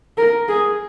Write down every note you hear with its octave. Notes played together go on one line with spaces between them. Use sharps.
A#4
G#4